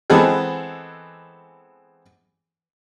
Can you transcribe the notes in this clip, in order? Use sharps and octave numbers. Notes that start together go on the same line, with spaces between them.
E3 G#3 B3 C4 G#4 A4